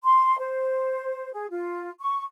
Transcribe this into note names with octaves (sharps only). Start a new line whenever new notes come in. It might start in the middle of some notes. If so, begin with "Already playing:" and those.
C6
C5
G#4
F4
C#6